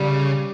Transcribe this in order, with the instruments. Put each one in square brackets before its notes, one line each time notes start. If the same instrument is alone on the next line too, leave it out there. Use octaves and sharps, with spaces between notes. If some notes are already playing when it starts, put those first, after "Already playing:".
Already playing: [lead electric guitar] C#3 [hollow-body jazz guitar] G3